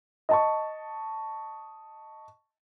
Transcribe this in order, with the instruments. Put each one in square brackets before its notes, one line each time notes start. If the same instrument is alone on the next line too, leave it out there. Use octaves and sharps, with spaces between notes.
[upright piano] D#5 A5 C#6